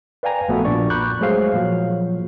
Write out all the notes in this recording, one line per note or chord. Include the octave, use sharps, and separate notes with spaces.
B4 D5 F5 G5 G#5 A#5
A#1 A3 B3 F#4 A4 B4
A#1 A#2 D4 D5 C#6
A#5 B5 C#6 D6 F#6 G6
F#3 G#3 A3 G#4 C5 F5
A#2 F3 F#3